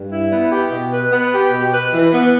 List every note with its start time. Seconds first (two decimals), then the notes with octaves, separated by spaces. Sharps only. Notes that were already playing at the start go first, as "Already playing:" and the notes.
Already playing: G2
0.11 E4
0.32 B3
0.51 G4
0.71 B2
0.92 B4
1.12 B3
1.33 G4
1.52 B2
1.73 B4
1.94 E3
2.13 B3